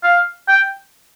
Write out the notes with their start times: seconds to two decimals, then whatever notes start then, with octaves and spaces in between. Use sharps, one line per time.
0.03 F5
0.48 G5